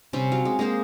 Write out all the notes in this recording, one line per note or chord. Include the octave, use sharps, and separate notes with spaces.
C3 G3 C4 C#4
F#3 F5
G#3
G#3 A#3 G#4 C5